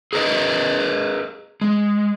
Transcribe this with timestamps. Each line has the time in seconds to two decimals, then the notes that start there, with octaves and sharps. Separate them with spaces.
0.13 G#4 A#4 B4 D#5
1.61 G#3